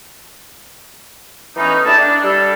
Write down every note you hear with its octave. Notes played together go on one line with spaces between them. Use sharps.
E3 A3 B3 C#4 D#4
A3 D4 E4 G4 G#4 A5
D4
G3 A4